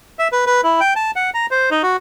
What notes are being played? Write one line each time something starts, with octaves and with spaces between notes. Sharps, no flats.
E5
B4
B4
E4
G5
A5
F#5
A#5
C5
D#4
F#4